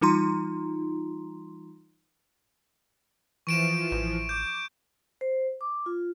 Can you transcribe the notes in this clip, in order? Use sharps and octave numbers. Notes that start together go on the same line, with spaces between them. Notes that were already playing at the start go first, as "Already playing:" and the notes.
E3 G3 D#4 F4 A#5 C6
E3 F3 C#6 D7 E7
A1
D6 G6
C5
D6
F4